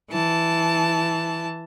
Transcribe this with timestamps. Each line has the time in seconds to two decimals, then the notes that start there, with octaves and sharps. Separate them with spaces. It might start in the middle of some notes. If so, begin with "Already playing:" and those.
0.10 E3 A5